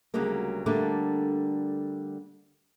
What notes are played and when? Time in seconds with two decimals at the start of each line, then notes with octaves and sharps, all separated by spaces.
0.14 D2 C#3 F#3 G3 A#3
0.66 D3 G3 A3 A#3 D4